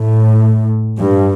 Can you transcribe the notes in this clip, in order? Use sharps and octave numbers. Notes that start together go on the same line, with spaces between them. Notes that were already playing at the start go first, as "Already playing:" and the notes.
Already playing: A2
G2